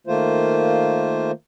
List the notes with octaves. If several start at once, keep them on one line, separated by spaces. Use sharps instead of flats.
D#3 A3 A#3 F4 C5